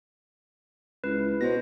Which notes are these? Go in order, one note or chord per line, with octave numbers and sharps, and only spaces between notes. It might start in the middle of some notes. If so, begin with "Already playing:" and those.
C#2 E4 B4
B2 C5 A#6